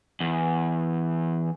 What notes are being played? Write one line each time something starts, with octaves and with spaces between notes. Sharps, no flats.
E2